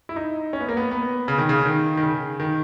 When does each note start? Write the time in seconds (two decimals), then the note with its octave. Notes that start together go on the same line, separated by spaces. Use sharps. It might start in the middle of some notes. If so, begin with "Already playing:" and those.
0.09 E4
0.16 D#4
0.53 C#4
0.61 B3
0.69 A#3
0.77 B3
0.91 B3
1.28 C#3
1.38 D#3
1.49 C#3
1.66 D#3
1.97 D#3
2.03 C#3
2.40 D#3